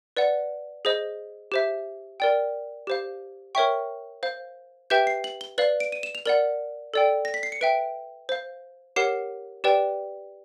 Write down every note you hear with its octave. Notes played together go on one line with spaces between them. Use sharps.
B4 D5 F#5
G#4 C5 D#5
G4 C5 E5
A#4 D5 G5
G4 C5 F5
A#4 C#5 E5 G5 C#6
C5 F5
G4 B4 E5 G5 G6
C7
F#7
G7
B4 D5 F5 F#7
D7
D#7
E7
F7
A#4 D5 F#5 F#7
A4 D5 G5
A#6
B6
C7
C#7
B4 E5 G5 D7
C5 F5
G4 A#4 C#5 F#5 C7
G4 B4 D5 G5